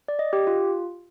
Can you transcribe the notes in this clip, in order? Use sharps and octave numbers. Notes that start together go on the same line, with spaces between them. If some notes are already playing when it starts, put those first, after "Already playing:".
D5
D#5
G4
F4